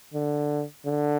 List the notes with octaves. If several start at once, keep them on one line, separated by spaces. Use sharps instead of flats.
D3
D3